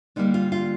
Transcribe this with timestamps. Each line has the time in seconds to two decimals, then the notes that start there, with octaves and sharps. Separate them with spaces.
0.16 D3 G3 A#3 D#4
0.34 F4
0.52 F4